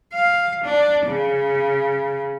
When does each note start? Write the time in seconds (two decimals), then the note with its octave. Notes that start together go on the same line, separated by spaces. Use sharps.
0.13 F5
0.64 D4
1.08 C#3